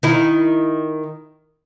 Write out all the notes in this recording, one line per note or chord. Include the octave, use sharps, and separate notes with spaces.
D#3 E4